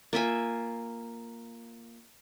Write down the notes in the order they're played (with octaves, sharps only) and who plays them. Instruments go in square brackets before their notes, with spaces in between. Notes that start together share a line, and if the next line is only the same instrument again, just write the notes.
[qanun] A#3 F4 E5 G#5